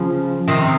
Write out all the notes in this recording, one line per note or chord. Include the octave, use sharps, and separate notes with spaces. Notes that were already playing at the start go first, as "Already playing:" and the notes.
Already playing: C#3 F3
C3 D#3